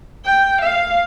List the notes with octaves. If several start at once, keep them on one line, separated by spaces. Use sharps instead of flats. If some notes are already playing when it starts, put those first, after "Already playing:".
G5
F5